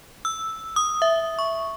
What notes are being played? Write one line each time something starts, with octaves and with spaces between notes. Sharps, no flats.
E6
D#6
E5
C#6